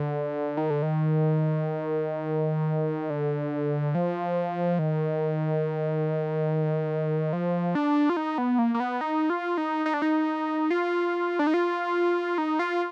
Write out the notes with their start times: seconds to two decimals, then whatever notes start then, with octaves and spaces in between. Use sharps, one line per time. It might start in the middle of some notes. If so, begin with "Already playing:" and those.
Already playing: D3
0.57 D#3
0.70 D3
0.82 D#3
3.10 D3
3.95 F3
4.79 D#3
7.33 F3
7.75 D4
8.09 F4
8.17 D#4
8.38 B3
8.59 A#3
8.74 A#3
8.80 B3
9.01 D#4
9.30 F4
9.58 D#4
9.86 D#4
9.94 D4
10.02 D#4
10.70 F4
11.39 D4
11.47 D#4
11.54 F4
12.38 D#4
12.59 F4